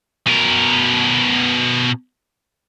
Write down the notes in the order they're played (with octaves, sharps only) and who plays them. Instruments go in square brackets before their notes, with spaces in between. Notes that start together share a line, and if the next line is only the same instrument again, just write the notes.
[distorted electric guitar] B2 A#4